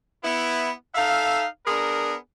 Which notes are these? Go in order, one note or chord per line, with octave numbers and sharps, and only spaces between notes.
B3 E4
D#4 A4 E5 F5
B3 D4 G#4 A#4